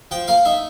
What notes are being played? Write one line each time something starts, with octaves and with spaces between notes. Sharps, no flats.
F3 G5
A#3 F5
D#4 E5